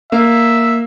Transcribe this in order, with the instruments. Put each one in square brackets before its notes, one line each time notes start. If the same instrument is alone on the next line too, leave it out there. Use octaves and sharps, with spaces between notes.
[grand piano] A#3 F5 [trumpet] E5